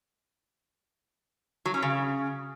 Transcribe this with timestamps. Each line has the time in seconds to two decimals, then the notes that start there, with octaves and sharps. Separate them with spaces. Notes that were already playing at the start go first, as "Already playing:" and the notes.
1.65 F#3
1.74 C#4
1.82 C#3